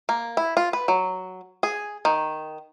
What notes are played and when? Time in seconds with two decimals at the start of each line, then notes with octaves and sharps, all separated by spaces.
0.09 A#3
0.37 E4
0.57 F4
0.73 B4
0.88 F#3
1.63 G#4
2.05 D#3